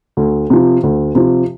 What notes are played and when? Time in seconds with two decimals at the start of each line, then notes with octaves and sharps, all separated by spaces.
0.17 D2
0.50 C3 F3
0.83 D2
1.15 C3 F3